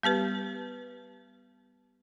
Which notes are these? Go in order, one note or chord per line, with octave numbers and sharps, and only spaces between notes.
G3 B3 G4 B4